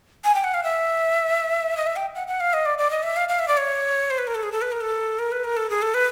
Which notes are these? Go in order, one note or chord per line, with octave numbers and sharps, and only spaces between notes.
G#5
G5
F#5
F5
E5
D#5
E5
G5
F#5
F#5
F5
D#5
D5
D5
D#5
E5
F5
F5
E5
D5
C#5
C5
B4
A#4
A4
G#4
A4
B4
A#4
A4
A#4
B4
A#4
A4
G#4
A4
B4